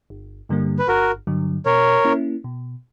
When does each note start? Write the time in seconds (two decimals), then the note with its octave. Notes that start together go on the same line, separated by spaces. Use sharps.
0.10 G1
0.49 G2 D3 G3 A#3
0.79 B4
0.88 G1 F#4 A#4
1.27 G2 D3 F#3
1.66 B2 A#4 C#5
2.05 A#3 C#4 E4
2.44 B2